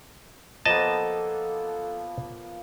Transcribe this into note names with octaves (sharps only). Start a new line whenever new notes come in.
F3 A#3 B3 A4 D#5 A5